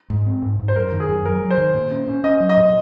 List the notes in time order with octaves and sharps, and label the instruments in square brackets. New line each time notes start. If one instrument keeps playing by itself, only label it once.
[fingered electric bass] G#2
C4
G#2
G#2
[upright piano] C5
[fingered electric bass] F#2 [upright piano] A#4
[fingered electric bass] D#3
[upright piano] G#4
[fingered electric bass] F#2
[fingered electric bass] F#3 [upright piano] A#4
[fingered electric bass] F#3
[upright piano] C5
[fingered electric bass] D#3
A#2
C#4
C#4
[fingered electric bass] C#4 [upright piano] D#5
[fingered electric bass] F#3
[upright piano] D#5
[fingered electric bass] A#2